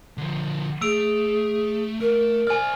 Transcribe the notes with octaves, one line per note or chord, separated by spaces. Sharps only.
D3 F3
A3 G#4 E6 D7 F7
A3 A#4
C5 D5 G#5 F6